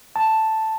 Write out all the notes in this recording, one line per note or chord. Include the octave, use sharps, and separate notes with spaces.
A5